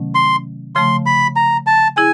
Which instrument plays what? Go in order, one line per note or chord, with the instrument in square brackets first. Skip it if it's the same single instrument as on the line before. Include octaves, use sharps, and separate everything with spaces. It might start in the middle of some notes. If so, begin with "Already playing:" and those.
Already playing: [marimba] C3 D#3 F#3 A3 C#4
[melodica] C6
[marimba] C#3 F3 A3 [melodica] C6
[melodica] B5
A#5
A5
[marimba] E4 G#4 [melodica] G#5